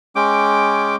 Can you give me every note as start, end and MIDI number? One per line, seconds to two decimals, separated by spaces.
0.16 0.96 56
0.16 0.96 61
0.16 0.96 79
0.16 0.96 86